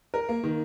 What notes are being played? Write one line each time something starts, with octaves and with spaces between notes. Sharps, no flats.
A#4
A#3
D#3